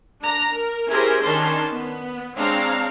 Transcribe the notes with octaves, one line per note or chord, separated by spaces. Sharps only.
D4 A#5
A#4
C#4 E4 G4 G#4 A#4 C5
D#3 C#4 D4 A5 C6
B3
G#3 C4 D4 C#5 F5 A#5